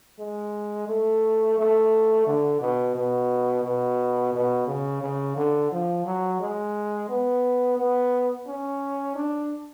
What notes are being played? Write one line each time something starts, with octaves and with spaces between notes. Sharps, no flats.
G#3
A3
A3
D3
B2
B2
B2
B2
C#3
C#3
D3
F3
F#3
G#3
B3
B3
C#4
D4